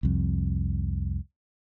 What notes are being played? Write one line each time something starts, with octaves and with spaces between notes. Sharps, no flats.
C2 F2